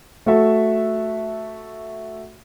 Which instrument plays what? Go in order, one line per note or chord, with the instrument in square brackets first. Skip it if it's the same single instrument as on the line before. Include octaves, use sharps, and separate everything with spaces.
[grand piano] A3 F#4 A4 E5